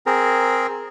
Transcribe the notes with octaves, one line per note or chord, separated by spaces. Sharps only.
C4 G#4 A#4